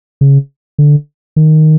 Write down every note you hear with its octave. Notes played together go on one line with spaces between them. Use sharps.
C#3
D3
D#3